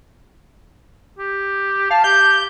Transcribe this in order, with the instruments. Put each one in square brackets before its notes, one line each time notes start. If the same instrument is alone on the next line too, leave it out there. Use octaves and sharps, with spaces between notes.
[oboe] G4
[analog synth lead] F5 [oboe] A5
[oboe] G4 [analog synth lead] G6